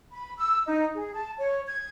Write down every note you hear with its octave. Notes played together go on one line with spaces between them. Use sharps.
B5
E6
D#4
G#4
A5
C#5
G#6